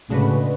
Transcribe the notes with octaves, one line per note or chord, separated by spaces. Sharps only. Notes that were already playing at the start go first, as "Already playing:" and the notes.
A2 C#3 G#3 D4 F#4 B4